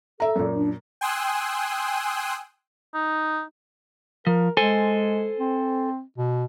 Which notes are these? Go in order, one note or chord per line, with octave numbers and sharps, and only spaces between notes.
A4 E5 A#5
F#2 A#2
D4
G5 G#5 C6 D#6 E6 F#6
D#4
F3 A#4
G#3 A4 C5 G#5
C4
B2